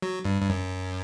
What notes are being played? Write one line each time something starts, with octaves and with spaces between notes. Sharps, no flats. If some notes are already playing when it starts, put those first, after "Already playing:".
F#3
G2
G2
F#2